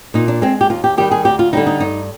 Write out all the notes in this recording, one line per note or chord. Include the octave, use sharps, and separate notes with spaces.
A#2 D#4
D4
G#3 C4
G4
D#2 F4
G4
D#3 G3 G4
G#4
D2 G4
F4
D3 G3 D#4
D#4
G2 D#4